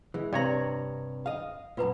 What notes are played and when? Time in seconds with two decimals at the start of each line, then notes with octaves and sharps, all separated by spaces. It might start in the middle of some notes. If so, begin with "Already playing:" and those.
0.14 E3 G#3
0.33 G2 C3 C#5 D5 A#5 C6
1.26 D#5 F5
1.77 F#2 A#2 F4 B4 A#5